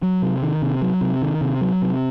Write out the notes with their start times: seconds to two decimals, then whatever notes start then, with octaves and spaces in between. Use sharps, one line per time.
0.03 F#3
0.22 C3
0.43 D#3
0.62 C3
0.82 F#3
1.01 C3
1.22 D#3
1.41 C3
1.61 F#3
1.82 C3